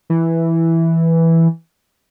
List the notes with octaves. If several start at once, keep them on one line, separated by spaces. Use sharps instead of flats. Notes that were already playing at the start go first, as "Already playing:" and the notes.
E3